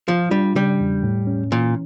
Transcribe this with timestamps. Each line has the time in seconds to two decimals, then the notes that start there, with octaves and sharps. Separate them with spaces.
0.08 F3 F4
0.31 G3 D4
0.55 C#3 G3
0.80 E2
1.03 A2
1.27 C#4
1.52 A#2 E3